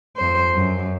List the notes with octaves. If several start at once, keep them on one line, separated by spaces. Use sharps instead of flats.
F2 C5
F#2